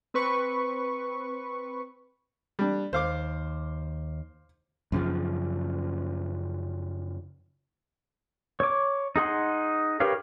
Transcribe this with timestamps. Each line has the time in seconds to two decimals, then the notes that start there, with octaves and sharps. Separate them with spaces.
0.14 C4 B4 C#6
2.59 G3 D4
2.93 D#2 C5 F5 D6
4.92 F#2 C#3 F3
8.60 C#5 D6
9.16 D#4 G#4 F#5 C6
10.00 G4 A#4 B4 C#5 F5